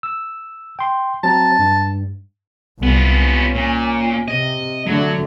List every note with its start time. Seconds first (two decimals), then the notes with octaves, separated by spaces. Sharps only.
0.03 E6
0.79 G5 C6
1.23 F#3 C4 A5 A#5
1.59 G2
2.83 C2 B3 F4
3.24 C#4
3.55 A#2
4.28 C3 D#5
4.87 D3 F#3 A3